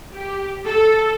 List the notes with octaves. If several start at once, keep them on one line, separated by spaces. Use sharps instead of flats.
G4
A4